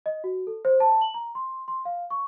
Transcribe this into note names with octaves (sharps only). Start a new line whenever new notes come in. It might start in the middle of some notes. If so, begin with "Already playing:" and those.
D#5
F#4
A4
C5
A5
F#7
A#5
C6
C6
F5
C#6